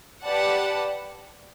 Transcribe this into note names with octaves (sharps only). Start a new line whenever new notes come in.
G4 B4 D5 F#5 A5